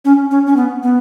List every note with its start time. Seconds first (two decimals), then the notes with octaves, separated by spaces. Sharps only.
0.05 C#4
0.31 C#4
0.47 C#4
0.57 B3
0.83 B3